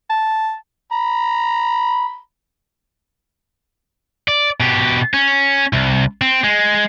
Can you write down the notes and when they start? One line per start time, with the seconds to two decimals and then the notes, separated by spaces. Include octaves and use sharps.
0.10 A5
0.92 A#5 B5
4.28 D5
4.60 B2 G4
5.14 C#4
5.73 C2
6.21 C4
6.44 G#3